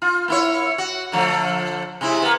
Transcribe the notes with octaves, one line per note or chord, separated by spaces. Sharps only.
F4
A#3 E4 C#5
F#4
D3 F3 A3
C3 G#3 E4
A#3 B3